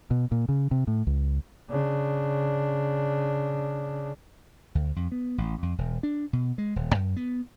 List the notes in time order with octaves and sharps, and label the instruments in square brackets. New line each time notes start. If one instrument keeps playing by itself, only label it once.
[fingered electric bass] B2
A#2
C#3
C3
A2
C#2
[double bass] C#3 D4
[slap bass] D2
F2
B3
A1
F2
E1
D4
B2
G#3
D#1
F#2
B3